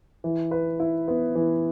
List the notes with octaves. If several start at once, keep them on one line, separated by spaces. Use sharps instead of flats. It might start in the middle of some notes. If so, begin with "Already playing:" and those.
E3
B4
E4
B3
E3